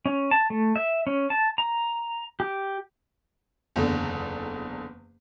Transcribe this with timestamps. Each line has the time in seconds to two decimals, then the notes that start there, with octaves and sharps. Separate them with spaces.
0.06 C#4
0.31 A5
0.50 A3
0.76 E5
1.07 C#4
1.30 A5
1.58 A#5
2.40 G4
3.76 F#1 E2 D3